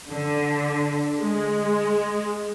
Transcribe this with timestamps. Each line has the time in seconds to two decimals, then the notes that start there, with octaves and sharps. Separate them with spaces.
0.12 D3
1.19 G#3